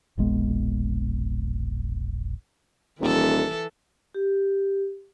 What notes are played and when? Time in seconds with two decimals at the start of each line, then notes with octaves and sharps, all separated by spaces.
0.18 E1 A#1 G#3 B3
3.01 D#1 E3 A4
4.14 G4